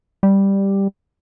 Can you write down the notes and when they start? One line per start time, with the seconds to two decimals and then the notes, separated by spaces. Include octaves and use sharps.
0.23 G3